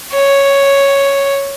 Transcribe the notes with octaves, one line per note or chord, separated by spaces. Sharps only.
C#5